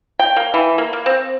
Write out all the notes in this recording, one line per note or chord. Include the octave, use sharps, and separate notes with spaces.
G5
A#3
E3
A#3
A#3
C4